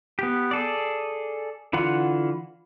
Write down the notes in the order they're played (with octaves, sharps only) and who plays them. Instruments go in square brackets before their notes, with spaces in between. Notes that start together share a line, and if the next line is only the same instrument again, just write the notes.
[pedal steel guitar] B3 G4
G#4 A4 D5
D3 E3 F4 F#5